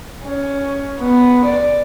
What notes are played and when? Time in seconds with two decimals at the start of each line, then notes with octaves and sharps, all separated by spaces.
0.24 C#4
0.99 B3
1.46 D5